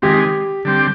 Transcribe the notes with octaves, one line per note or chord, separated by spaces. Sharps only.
D#3 G#3 C4 G4
D3 G3 C4 G4